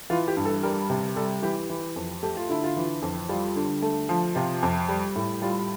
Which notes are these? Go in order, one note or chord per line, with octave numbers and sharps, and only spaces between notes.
E3 F4
G4
G2
A4
G3 A#4
C3
G3 A4
E3 G4
E3
F2
A3 G4
F4
D3 E4
F4
E3
F2
G3 F4
D3
A3
F3
C3 F4
F2
G3
A2
G3 F4